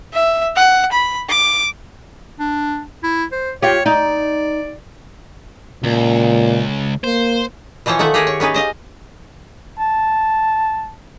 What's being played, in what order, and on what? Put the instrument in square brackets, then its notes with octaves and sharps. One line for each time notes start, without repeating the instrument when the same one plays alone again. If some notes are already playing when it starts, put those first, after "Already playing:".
[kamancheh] E5
F#5
B5
D6
[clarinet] D4
E4
C5
[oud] F4 G4 [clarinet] C#5
[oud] D#4 [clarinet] D5
[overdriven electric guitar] C#2 [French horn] A#2
[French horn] A#3 [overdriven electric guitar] C5
[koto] B2 E3 F3 C5 C#5
D#3 A3 E5 F#5
G4 G#4 A#4 F#5 G#5
C#5
B3 C#4 D#4 B4
C5 D#5 F5
[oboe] A5